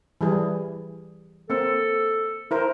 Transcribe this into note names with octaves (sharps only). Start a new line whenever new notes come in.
E3 G3 G#4
A#3 C4 A4
E4 A#4 C5